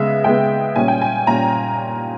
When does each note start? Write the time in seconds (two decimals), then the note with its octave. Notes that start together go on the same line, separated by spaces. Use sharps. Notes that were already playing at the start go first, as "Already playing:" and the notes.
Already playing: C#3 G#3 B3 E5
0.24 C#3 G#3 B3 G5
0.76 A#2 G3 C#4 G#5
0.88 G5
1.02 G#5
1.27 A#2 G3 C#4 A#5